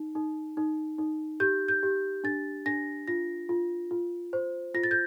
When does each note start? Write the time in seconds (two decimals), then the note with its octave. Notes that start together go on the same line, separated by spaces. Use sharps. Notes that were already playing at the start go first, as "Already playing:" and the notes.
Already playing: D#4
0.15 D#4
0.57 D#4
0.99 D#4
1.40 G4 G6
1.68 G6
1.83 G4
2.24 D4 A6
2.66 D4 A#6
3.08 F4 A#6
3.49 F4
3.91 F4
4.33 C5
4.74 F4 A#6
4.83 A6
4.91 G6